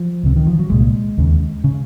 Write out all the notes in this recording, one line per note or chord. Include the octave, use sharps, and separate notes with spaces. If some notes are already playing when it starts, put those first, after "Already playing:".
Already playing: F3
C#2 C3
D#3
F3
F#3
C2 A#2 G#3
D#2 C#3
C#3